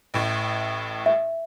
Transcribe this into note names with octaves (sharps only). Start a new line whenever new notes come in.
A1 A2
E5